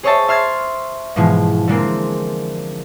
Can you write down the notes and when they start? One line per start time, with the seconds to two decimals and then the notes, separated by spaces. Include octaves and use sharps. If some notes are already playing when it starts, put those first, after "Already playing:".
0.03 G#4 C5 C#5 D#5 E5 A5
0.28 E5 C6 F6 G#6 A6
1.16 G#2 B2 E3 F3 G#3
1.68 D3 G#3 A#3 C4